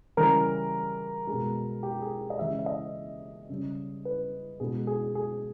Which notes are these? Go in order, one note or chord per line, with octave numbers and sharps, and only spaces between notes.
C#3 E3 G3 A#4
G#3
B2
G4
G#4
D#5
C#3 E3 G#3 E5
E5
D#5
C#3 G3
B4
B2 G#3 G#4
G#4
G#4